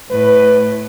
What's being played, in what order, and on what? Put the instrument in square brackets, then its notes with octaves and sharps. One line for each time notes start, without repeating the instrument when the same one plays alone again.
[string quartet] A2 [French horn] B4